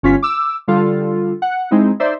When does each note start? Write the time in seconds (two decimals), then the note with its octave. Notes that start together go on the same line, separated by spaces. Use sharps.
0.03 G1 C#4 F4 B6
0.23 D6 E6
0.68 D3 G3 F4 A4
1.42 F#5
1.71 G#3 C4 D#4 E4
2.00 D#4 C5 D5 E5